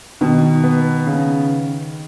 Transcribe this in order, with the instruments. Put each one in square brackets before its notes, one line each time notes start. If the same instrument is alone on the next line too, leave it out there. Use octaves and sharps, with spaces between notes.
[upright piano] B2 [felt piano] D#3
[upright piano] B3
C#3